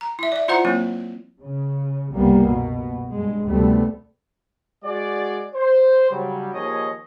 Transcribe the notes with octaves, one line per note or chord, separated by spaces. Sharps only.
A#5
E4 E5
D5 E5
E4 F4 C5 F#5 A#5
F#3 A#3 C4 E4
C#3
F#1 C2 G3 A#3 B3
B2
G2 G#3
D2 C3 G3 A3 B3
G#3 F#4 G#4 D5
C5
C#3 F#3 G3
D#2 F3 G#4 C#5 D#5